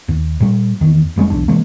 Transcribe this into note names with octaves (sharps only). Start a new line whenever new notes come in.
D#2
A#2 G3
E2 D#3
F1 G3 G#3 C#4
B1 E2 D4
C3 E3 G#3 A#3